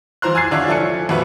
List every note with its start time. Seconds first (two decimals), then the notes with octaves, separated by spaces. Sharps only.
0.22 E3 F3 C5 A#5 C6 F#6
0.35 G#5 E6 F#6 G#6 A6 C7
0.51 D3 D4 E4 F4 C#5
0.68 F3 E4 A4 G#5 C#7
0.80 F3
1.09 F2 A#2 F#4 B4 E5 C#6